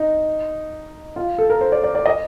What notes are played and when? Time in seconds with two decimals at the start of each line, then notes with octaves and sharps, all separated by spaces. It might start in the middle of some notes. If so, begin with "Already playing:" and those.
Already playing: D#4
1.16 F4
1.38 A4
1.50 A#4
1.61 C5
1.72 D5
1.84 D5
1.95 D5
2.06 D#5